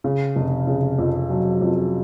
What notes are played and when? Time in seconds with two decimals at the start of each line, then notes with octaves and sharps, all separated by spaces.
0.04 C#3
0.36 F1
0.67 C#3
0.99 F2
1.30 F#3
1.61 F2